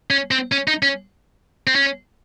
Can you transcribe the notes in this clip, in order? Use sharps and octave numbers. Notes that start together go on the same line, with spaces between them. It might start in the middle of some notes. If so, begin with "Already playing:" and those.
C#4
C4
C#4
D#4
C#4
C4
C#4